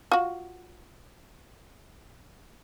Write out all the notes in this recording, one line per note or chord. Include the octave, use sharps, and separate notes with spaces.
F4 F#4